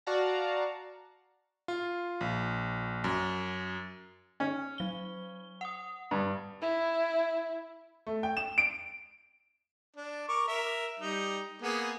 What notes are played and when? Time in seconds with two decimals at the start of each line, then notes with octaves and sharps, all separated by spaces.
0.06 F#4 D5 F5 A5 A#5
1.68 F4
2.21 A#1
3.04 F#2
4.40 C#4
4.78 F#3 G7
5.61 F#5 D#6
6.11 G2
6.62 E4
8.07 A3
8.23 G5
8.37 E7
8.58 D7
9.96 D4
10.28 A#4 C#6 D6
10.48 A#4 E5
11.00 G3 D#4
11.62 A#3 B3 G#4